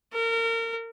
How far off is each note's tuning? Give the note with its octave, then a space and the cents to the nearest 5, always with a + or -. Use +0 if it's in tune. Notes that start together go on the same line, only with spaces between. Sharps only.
A#4 -30